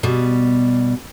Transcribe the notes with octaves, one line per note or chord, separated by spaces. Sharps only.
B2 G3